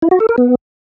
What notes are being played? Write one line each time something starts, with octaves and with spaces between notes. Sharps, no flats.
E4
F#4
A4
A#4
B3